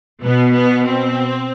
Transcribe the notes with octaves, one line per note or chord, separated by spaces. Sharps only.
B2 B3
B3
C4